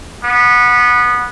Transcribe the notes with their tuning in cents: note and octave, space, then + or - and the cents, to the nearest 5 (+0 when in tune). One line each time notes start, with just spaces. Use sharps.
B3 -15